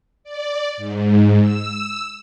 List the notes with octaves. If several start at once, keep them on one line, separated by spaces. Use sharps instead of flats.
D5
G#2
E6